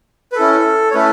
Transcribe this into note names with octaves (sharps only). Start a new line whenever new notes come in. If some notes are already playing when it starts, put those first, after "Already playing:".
B4
C#4 E4 A4
C#5
A3 C#4 E4 A4 B4